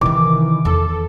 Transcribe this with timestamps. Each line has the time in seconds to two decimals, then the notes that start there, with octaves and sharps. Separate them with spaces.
0.01 C3 D#3 E3 C4 D6
0.65 E2 A4